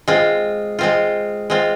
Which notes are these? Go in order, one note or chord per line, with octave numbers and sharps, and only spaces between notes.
G#3 C4 F4
G#3 C4 F4
G#3 C4 F4